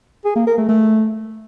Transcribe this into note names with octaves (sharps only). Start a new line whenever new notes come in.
G#4
A#3
A#4
A3
A3